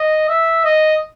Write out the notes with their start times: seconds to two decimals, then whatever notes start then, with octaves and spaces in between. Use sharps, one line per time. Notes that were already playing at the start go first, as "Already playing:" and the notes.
Already playing: D#5
0.29 E5
0.64 D#5